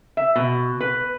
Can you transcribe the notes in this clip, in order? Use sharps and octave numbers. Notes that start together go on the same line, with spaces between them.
E5
B2
B4